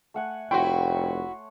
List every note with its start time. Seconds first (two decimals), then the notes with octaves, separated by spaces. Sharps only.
0.14 A3 F#5 G#5
0.51 F1 E4 F#4 C#5 G5 C6